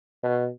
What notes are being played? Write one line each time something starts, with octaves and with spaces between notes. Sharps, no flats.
B2